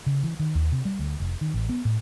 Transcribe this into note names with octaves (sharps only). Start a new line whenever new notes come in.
C#3
E3
D#3
D#2
C3
G3
D2
F1
D#3
A1
B3
A2